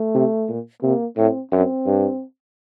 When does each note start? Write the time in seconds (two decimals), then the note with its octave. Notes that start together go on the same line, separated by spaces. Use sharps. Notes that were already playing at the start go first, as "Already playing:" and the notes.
Already playing: A3
0.14 C3
0.49 A#2
0.82 C3 A#3
1.17 A2 C4
1.51 F#2 C4
1.86 G2